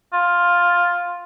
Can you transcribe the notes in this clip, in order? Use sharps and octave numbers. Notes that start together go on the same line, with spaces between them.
F4